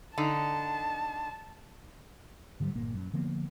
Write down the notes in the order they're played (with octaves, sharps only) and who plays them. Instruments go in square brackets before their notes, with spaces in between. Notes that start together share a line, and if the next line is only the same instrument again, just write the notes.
[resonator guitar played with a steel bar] D3 D#4 [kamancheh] A5
[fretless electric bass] G#2 D3 F#3 G3
G1 A#2 A#3
F#2
D3 F3 A#3 B3